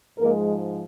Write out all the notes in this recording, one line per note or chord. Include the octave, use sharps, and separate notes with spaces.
G#2 F3 G#3 A#3 A#4